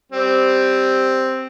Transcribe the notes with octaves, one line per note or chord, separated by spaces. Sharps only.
G3 C4